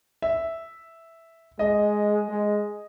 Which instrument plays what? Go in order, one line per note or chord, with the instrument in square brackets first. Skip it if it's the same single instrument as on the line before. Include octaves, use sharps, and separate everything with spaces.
[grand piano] E5
[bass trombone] G#3 [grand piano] D#5
[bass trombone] G#3